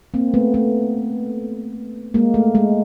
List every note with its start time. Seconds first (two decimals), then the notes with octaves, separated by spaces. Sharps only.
0.14 A#3 C4
0.34 A3 B3
0.54 A3 B3
2.14 G#3 A#3
2.34 A3
2.55 G#3